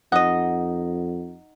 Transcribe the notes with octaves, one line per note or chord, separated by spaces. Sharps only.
F2 D#4 D#5 F#5